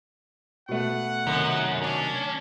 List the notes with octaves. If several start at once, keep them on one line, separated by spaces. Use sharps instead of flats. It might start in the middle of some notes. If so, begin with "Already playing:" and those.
B2 A3 F#5
F#2 C3 D#3 F#3
C#4 D4